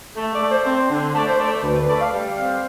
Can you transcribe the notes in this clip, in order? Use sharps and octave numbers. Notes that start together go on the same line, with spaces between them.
A3
D5
A3
C5
C4
D3
A3 D5
C5
A3 D5
C5
D2 B4
B4
A3 D5
F5
G3
C4 F5